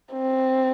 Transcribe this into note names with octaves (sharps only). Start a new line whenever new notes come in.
C4